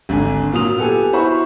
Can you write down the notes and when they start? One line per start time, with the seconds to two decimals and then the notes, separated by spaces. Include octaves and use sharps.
0.09 G#1 D3 G#5
0.53 A#2 F#3 F4 D#6 F7
0.78 B3 G4 A4 G#5
1.13 E4 F#4 C5 B5 C#6